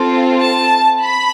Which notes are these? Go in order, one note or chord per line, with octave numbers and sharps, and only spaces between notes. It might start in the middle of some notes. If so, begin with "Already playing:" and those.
Already playing: C4 F4 A4
A5
B5